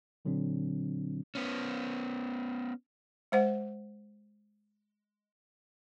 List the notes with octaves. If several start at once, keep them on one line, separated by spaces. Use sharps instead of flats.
A#2 D3 F#3 C4 D4
B3 C#4
G#3 C5 F#5